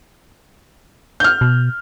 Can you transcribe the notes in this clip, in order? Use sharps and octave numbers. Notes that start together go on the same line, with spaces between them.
F6 G6
B2